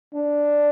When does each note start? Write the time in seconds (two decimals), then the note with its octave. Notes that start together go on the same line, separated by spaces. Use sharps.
0.14 D4